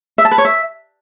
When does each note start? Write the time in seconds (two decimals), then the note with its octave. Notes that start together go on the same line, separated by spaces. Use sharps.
0.18 E5
0.25 A5
0.31 B4
0.38 C#5
0.45 E5